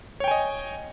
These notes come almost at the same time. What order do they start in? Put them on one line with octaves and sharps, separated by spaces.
C#5 G5 G#5 D#5